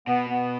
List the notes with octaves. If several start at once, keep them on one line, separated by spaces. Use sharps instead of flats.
B2 B3
B3